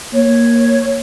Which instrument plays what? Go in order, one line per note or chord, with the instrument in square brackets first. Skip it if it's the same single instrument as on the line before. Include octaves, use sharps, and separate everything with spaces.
[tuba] A#3 [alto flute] C#5